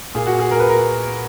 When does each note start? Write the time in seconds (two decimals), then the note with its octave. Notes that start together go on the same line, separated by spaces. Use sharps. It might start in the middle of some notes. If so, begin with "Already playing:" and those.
0.15 A#2 G#4
0.27 F#4
0.39 G#4
0.51 A#4
0.60 B4
0.69 A#4